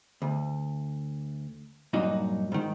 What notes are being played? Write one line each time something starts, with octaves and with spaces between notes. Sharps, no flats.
D2
G2 A#2 F#3 D#4
G#2 D#3